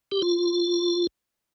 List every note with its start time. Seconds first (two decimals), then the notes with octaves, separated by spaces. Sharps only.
0.12 G4
0.22 F4